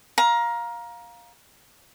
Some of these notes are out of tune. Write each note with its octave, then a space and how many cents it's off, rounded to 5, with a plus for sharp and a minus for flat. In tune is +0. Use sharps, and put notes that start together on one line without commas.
F5 +10 A#5 +20